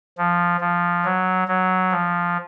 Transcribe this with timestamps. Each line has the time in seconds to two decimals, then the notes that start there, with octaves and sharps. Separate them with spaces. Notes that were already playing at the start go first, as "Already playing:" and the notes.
0.18 F3
0.61 F3
1.05 F#3
1.48 F#3
1.92 F3